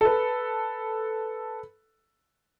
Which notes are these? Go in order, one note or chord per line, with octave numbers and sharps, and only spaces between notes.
A4 B4